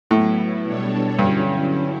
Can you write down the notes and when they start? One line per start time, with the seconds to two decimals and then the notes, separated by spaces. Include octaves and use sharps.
0.10 A2 F#3 B3 E4
0.64 B2 G3 D4 A4 C#5
1.19 G2 D3 F#3 C#4 E4